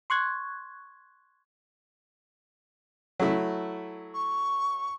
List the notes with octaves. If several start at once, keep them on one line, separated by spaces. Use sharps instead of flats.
C6 C#6 F#6 G#6
F#3 A3 E4
C#6